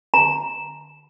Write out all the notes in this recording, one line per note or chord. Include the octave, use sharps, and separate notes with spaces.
A#5